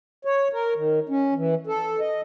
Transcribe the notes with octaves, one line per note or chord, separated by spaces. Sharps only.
C#5
A#4
D#3
C#4
E3
A4
D#5